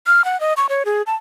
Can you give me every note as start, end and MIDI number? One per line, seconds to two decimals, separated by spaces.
0.07 0.24 89
0.25 0.39 78
0.40 0.53 75
0.57 0.67 85
0.69 0.83 73
0.85 1.02 68
1.07 1.14 81